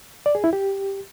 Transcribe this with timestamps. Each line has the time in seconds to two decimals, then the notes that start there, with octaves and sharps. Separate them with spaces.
0.26 D5
0.35 G#4
0.44 E4
0.53 G4